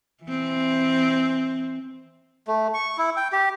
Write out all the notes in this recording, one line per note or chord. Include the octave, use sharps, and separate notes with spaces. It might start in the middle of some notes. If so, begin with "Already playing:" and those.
E3 C4
A3
C#6
E4
G5
G4